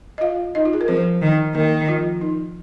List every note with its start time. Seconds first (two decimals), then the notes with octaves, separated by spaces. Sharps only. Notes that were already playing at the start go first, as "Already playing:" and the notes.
0.18 D#5
0.21 F4 F5
0.55 D#4 D#5
0.65 F4
0.73 G#4
0.81 A#4
0.88 F3 C4 C5
1.22 D#3
1.54 D#3 A#3 A#4
1.88 F3 F4
2.21 D#4